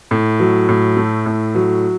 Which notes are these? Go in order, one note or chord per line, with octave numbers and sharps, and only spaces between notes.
A2
F#3
A2
A3
A2
F#3